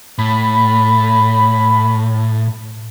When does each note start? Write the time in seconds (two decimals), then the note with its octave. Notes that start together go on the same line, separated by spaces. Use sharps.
0.18 A2 B5